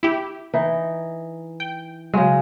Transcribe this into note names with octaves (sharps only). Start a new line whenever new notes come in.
E4 G4
E3 D#4
G5
C#3 F#3 G#3